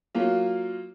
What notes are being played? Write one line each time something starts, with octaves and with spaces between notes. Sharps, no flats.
F#3 A#3 F4